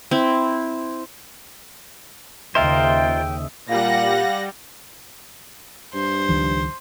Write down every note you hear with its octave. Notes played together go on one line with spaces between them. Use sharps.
C4 E4
D#2 C#3 F4 A#4 C5 D#5 E5 G5
A#2 G3 F5 F#5 A#6
G2 C5
C#2 D#3 F3